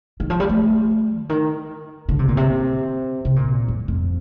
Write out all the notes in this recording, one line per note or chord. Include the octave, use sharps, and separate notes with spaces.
D#3
F3
G3
A3
D3
D#3
D3
C3
A#2
C3
C3
A#2
F2
F2